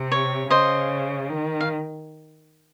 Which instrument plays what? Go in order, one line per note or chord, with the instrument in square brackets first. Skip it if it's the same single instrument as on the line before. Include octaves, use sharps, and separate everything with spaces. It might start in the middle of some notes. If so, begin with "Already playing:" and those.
Already playing: [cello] C3
[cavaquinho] C#5
[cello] C#3 [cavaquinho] C5 D#5
[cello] D#3
[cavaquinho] F5